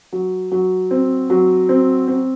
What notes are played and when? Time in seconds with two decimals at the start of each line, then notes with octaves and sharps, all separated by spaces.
0.13 F#3
0.52 F#3
0.91 C4
1.30 F#3
1.69 C4
2.08 C4